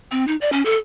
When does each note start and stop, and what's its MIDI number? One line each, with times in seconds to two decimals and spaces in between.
0.12 0.25 60
0.28 0.36 63
0.41 0.50 74
0.52 0.64 61
0.65 0.76 69